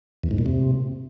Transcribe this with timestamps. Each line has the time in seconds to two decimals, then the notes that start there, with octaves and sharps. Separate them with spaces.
0.23 E2
0.31 G#2
0.38 A#2
0.46 C3